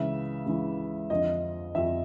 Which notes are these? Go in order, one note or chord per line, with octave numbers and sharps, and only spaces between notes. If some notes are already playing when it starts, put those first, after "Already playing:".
Already playing: C#2 C#3 E3 E5
C#2 C#3 E3
F2 D3 F3 D#5
F2 D3 F3 E5